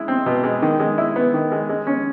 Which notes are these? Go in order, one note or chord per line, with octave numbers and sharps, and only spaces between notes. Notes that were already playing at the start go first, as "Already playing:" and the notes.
Already playing: G#3 E4
C4
B2
G#3
D#3
G#3
E4
B3
D#3
G#3
G#3
C#4